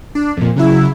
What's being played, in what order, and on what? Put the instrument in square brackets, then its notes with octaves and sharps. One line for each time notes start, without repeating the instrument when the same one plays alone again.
[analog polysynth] D4
F2 A#2
C#3 F#3 E4